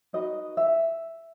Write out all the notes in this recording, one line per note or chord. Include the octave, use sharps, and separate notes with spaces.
D#4 F#4 B4 D#5
E5